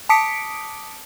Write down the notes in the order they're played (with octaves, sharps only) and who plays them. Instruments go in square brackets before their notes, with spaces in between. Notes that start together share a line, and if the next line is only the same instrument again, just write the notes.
[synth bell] A5 D6 D#6 B6 C#7 D7